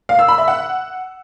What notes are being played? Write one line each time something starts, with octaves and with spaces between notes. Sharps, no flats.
F5
E6
B5
E5
F#5